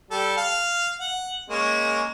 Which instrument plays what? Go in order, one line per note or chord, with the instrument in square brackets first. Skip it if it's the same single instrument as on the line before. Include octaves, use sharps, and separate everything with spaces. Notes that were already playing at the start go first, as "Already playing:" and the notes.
[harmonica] G3 A4
F5
F#5
G#3 A#3 C#4